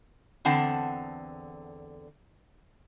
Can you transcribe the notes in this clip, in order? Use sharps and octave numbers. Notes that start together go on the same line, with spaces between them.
E2 D3 C4 F#5 A5